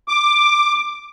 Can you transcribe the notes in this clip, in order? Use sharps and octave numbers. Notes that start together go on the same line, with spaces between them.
D6